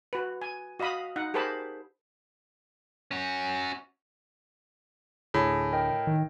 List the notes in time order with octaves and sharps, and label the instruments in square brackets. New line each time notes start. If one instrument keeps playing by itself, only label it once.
[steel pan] F#4 B4
G#5
F#4 D#5 F5 B5 D#6
D#4 F#5
G4 G#4 A#4 C5 A5 B5
[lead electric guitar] C#4 F#4
[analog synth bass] D2 [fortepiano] A2 [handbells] G#4 G#5
[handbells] A#4 D#5 G5
[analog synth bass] D#3